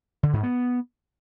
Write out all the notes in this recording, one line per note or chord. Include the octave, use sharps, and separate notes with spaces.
D3
G#2
B3